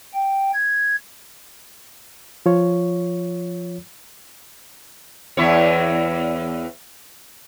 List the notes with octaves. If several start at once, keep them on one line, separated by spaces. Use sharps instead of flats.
G5
G#6
F3 F4 C#5
E2 E4 C#5